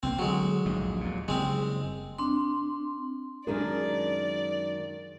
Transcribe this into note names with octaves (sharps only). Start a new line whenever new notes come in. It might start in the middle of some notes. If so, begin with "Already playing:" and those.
C2 F3 A#3 C4
D3 F#3 G#3
A#1 D#2 G#2
D#2 A#2
F#1 G3 G#3 C4
C4 D4 C6
F#2 D#3 G#3 D4 G#4 A#4 D5